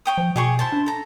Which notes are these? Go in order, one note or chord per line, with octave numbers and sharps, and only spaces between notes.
C#5 G5 D#6
F3
B2 G4 G#4 C#6
E4 C5 A5
D4
A4 A#5